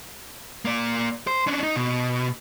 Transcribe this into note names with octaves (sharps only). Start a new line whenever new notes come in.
A#3 D5
C5
C#4 D4
D#4
B2